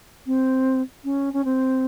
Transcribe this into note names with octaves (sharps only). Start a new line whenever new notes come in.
C4
C#4
C#4
C4